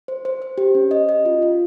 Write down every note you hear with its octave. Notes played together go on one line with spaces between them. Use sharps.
C5
C5
C5
G4
C#4
D#5
D#5
F4
F4